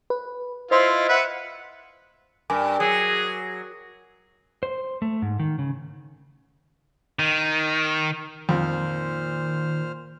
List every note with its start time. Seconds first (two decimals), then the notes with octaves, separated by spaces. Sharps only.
0.10 B4
0.71 E4 F4 C5 D#5 C6
1.09 B4 E5 F#5
2.50 G2 A#4 G#5 D6
2.80 F#3 G#4
4.63 C5
5.02 A3
5.22 G#2
5.39 D#3
5.59 C#3
7.19 D#3
8.49 F2 A#2 D#3 C5 F6